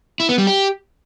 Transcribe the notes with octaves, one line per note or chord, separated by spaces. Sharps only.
E4
B3
G3
G4